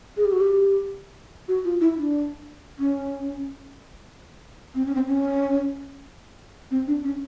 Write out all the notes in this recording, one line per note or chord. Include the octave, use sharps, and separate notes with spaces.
G#4
G4
F#4
G4
F#4
F4
E4
D4
C#4
C4
C#4
C4
C#4
C4
D4
C#4